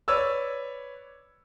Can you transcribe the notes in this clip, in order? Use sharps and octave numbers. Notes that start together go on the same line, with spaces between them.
B4 C#5 D5 E6